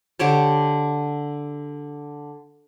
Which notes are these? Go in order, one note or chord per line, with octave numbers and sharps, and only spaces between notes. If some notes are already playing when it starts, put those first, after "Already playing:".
D3 G4 C#5 A5